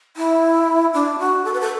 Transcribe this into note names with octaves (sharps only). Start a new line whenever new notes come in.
E4
D4
F#4
A4
B4
A4